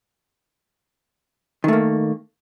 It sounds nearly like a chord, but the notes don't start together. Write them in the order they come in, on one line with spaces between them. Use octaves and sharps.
D#3 A3 A#3